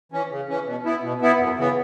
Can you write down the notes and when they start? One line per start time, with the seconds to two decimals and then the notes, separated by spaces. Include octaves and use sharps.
0.12 E3 C#4
0.31 C#3
0.49 E3 C#4
0.66 B2
0.85 B3 E4
1.03 B2
1.22 B3 E4
1.39 F#2
1.58 C#3 E3 B3